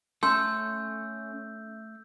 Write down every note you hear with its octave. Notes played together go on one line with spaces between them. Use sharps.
A3 C#4 A4 C6 E6 G6